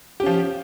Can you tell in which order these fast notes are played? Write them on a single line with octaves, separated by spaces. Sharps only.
G4 C#4 F3